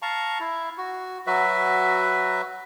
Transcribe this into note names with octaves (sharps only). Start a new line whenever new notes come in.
F5 A5 A#5 C#6
E4
F#4
F#3 F#4 B4 E5